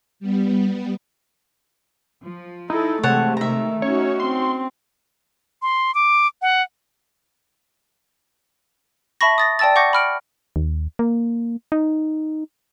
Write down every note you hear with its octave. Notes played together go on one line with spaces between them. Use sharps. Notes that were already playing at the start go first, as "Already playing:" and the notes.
G3 B3
F3
D#4 E4 A4
C3 E3 G#3 A3 C#5 F#5 A5
D#3 E5 A#5
C#4 D#4 F#4 C#5
C4 C6
C6
D6
F#5
E5 A5 B5 C#6 A#6
D#6 A6 A#6
D5 G5 A5 E6 A6
F#5 C#6 D6 G6 A#6 C#7
B5 F6 D7
D#2
A#3
D#4